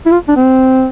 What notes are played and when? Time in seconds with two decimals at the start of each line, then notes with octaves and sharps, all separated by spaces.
0.06 E4
0.12 F4
0.28 D4
0.36 C4